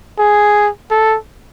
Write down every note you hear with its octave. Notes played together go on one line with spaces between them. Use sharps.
G#4
A4